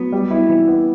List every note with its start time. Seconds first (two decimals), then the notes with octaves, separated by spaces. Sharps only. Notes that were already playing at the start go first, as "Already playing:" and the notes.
Already playing: F#3 B3
0.12 G3
0.31 E4
0.49 E3
0.68 B3